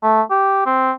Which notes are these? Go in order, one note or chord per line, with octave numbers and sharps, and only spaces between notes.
A3
G4
C4